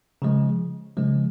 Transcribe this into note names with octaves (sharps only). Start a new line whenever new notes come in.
C#3 F3 G#3
C#3 F3 G#3